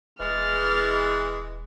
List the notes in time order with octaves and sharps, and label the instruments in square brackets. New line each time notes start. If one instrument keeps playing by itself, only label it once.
[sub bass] D#1 [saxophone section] E3 G#3 [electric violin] F6 A6